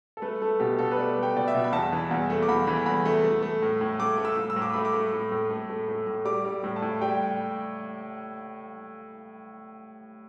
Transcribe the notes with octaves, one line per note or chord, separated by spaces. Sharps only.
A4
A3 B4
A3 A4
B2 G4
B2 A4
B4
A3 D5
A3
G5
B2 D5
E5
B2
B5
E2 A5
E3
E2
A3
D6
E2 B5
E3 B5
E2 B5
A3
A3
A3
A2
A2
A3 D6
A3
E6
A2
E6
A2
D6
A3 B5
D6
A3
A2
A2
A3
A3
A2
A2
G3 D6
G3
A2
A5
A2
G3 G5